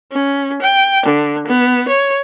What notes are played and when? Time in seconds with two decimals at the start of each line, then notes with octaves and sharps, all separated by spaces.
0.12 C#4
0.62 G5
1.06 D3
1.47 B3
1.88 C#5